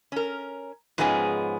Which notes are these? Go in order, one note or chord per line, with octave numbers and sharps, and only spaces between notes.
C#4 A#4
G#2 F3 G#3 B3 C#4 G#4